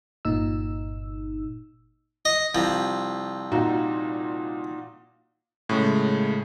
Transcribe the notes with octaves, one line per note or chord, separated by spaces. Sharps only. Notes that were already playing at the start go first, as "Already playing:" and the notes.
G1 A#2 D#4 E6
D#5
C2 F3
A#2 D#4 F#4
A2 C#3 G#3